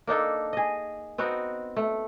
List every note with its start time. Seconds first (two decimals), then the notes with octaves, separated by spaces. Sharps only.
0.07 A#3 D4 D#4 A4
0.53 G#4 D#5
1.18 B3 C4 D#4 F#4
1.76 A3